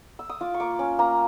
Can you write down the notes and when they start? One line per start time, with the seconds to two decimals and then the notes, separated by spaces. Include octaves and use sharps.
0.19 E6
0.29 D#6
0.41 F4 D6
0.54 C#6
0.60 A#3 D6
0.79 C#4
0.99 A#3 A#5